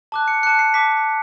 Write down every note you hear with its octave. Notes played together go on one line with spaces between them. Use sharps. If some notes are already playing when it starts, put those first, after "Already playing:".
A5 D6 F#6
C#7
A5 D6 F#6 C#7
C7
A5 D6 B6